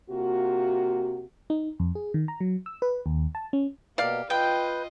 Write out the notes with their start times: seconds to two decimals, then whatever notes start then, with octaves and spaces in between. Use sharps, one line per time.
0.10 C3 A#3 F4 F#4
1.50 D#4
1.80 F2
1.95 G#4
2.14 D#3
2.28 A#5
2.40 F#3
2.66 E6
2.82 B4
3.06 D#2
3.35 A5
3.53 C#4
3.98 B2 A#3 G4 D5 F5
4.30 F4 B4 D#5 G5 G6